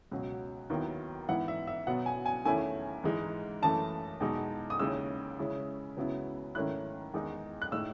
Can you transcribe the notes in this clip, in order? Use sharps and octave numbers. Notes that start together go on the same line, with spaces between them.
C#2 B2 F#3
D#2 D#3 F#3 B3 E4
G#2 E3 B3 E4 F#5
E5
E5
B2 F#3 B3 F#5
G#5
G#5
E2 D#3 A3 C#4 E4 G#5
G#2 E3 G#3 D#4
F#2 E3 A3 A5
E2 B2 G#3 D#4
D#6
D#2 C#3 G#3 C#4 E4 E6
C#3 G#3 C#4 E4
C#2 C#3 F#3 B3 E4
G#2 D#3 A3 C#4 E4 F#6
E2 D#3 G#3 D#4
F#6
A2 G#3 D#4 E6